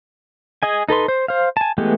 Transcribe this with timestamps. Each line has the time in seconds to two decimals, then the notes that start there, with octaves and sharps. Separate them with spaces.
0.63 G#4 D#5 G#5
0.89 D#4 A4 B4 C6
1.08 C5
1.28 C5 F5
1.57 G#5 A5
1.78 E3 G#3 A3 B3 G4